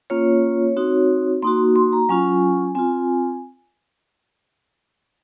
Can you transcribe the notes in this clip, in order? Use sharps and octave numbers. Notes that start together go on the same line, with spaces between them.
A#3 C#4 F4 C#5
C4 D#4 F#4
A#3 D#4 F#4 C6
C6
A#5
F#3 C#4 F4 G#5
C4 F4 G#5